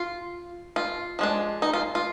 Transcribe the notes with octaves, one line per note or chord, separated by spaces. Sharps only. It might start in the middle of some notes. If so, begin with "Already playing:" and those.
Already playing: F4
F4
F3 G#3 D4
D#4
F4
F4